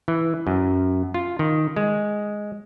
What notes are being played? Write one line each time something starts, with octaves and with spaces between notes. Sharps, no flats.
E3
F#2
F4
D#3
G#3